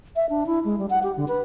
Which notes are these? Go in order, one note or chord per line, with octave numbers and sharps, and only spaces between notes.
E5
D4
E4
G#3
G3
F#5
G4
D3
B4